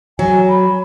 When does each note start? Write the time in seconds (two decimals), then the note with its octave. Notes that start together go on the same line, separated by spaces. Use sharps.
0.19 F#3 G#5
0.49 B5